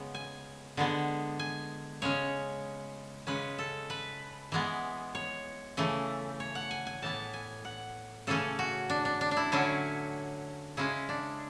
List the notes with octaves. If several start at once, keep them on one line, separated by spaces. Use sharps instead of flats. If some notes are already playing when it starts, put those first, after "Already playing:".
Already playing: C#3 G#3 B3
G#5
D3 G#3 B3
G#5
C#3 G#3 C#4 C#5
C#3 G#3 C#4 B4
A4
B4
E3 G#3 B3
C#5
C#3 E3 A3
C#5
F#5
G#5
G#5
A2 E3 B3 A5
G#5
F#5
C#3 E3 A3 C#4 A4
F#4
D4
D4
D4
D4
E4
D3 F#3 C#4 E4
C#3 G#3 C#4 E4
D4